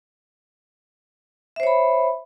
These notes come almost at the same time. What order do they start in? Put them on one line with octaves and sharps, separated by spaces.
E5 C5 C#5 B5